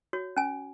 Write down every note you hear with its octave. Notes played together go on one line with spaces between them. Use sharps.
F#4 C#5
C#4 G#5